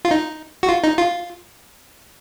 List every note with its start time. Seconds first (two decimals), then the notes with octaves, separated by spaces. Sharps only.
0.05 F4
0.11 D#4
0.63 F#4
0.69 F4
0.84 D#4
0.98 F4